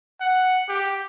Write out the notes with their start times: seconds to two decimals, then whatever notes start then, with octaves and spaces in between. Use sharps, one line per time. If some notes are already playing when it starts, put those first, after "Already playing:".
0.20 F#5
0.69 G4